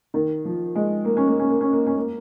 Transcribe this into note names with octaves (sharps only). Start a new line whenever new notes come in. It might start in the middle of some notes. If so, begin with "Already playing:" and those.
D#3
F3
G#3
A#3
C#4
A#3
C#4
A#3
C#4
A#3
C#4
A#3